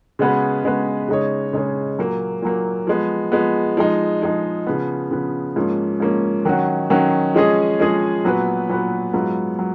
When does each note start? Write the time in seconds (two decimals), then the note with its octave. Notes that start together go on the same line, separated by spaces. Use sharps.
0.19 C#3 G#3 B3 F#4 B4
0.64 C#3 G#3 B3 F#4 B4
1.08 C#3 G#3 D#4 G#4 C#5
1.53 C#3 G#3 D#4 G#4 C#5
1.99 A#2 F#3 A#3
2.42 A#2 F#3 A#3
2.87 F3 G#3 B3
3.32 F3 G#3 B3
3.77 F3 G#3 D#4
4.22 F3 G#3 D#4
4.67 C#3 F3 B3
5.11 C#3 F3 B3
5.56 G#2 F3 A#3 C#4
6.00 G#2 F3 A#3 C#4
6.45 D#3 F#3 C#4 F#4
6.90 D#3 F#3 C#4 F#4
7.34 F3 G#3 C#4 G#4 D#5
7.79 F3 G#3 C#4 G#4 D#5
8.24 A#2 F#3 B3 F#4 B4
8.69 A#2 F#3 B3 F#4 B4
9.13 G#2 F#3 B3 F4
9.59 F#3